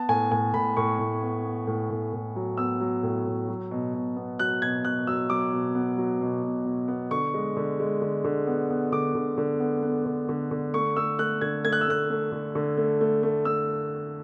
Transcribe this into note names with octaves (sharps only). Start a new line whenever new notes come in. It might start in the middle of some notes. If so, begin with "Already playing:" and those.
Already playing: B3 A5
A2 G#5
A2 G#5
A2 B5
A2 C#6
A2
B3
B3
A2
A2
A2
F#3
B3 E6
F#3
A2
A2
F#3
B2
B2
B3
F#3 F#6
B2 G#6
B2 F#6
F#3 E6
F#3 D6
B2
B3
F#3
B2
B2
B2
B3
D3 C#6
G#3
D3
G#3
D3
D3
B3
B3
D3 D6
D3
D3
B3
B3
D3
D3
D3
A3 C#6
A3 E6
A3 F#6
D3 G#6
A3 G#6
F#6
E6
A3 F#6
A3
D3
D3
A3
A3
A3
A3 E6